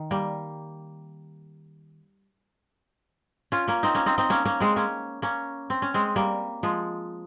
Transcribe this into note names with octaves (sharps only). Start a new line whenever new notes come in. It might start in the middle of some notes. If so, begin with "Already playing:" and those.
Already playing: D#3
G3 A#3
C#4 F4
A#3 C#4
C4 D#4
A#3 C#4
C4 D#4
C4 D#4
A#3 C#4
A#3 C#4
G#3 C4
A#3 C#4
A#3 C#4
C4
C#4
G#3 C4
G3 A#3
F3 G#3